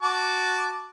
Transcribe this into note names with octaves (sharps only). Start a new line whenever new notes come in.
F#4 A5 D6